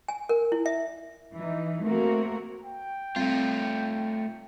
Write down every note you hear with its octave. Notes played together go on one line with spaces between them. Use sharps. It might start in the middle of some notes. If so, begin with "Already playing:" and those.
G#5
A#4
E4
E5
E3 D#4
A3 A#3 C4 F#4 A#4
G5
G3 A3 C4 F4